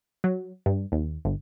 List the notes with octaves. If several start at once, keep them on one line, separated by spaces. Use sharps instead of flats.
F#3
G2
D#2
G1